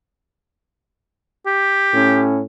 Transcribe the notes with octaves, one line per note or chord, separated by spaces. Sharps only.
G4
A2 C#4